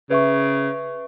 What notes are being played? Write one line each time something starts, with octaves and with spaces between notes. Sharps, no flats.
C#3 B4 E5 C#6